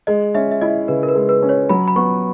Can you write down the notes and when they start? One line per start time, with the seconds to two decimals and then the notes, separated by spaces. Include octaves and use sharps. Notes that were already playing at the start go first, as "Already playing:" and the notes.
0.07 G#3 D#5
0.35 C#4 E5
0.51 E5
0.61 E4 D#5
0.88 C#3 B4
1.03 A#4
1.08 B4
1.15 G#3
1.29 B4
1.42 C#4
1.49 C#5
1.69 F#3 B5
1.88 B5
1.96 B3 C#6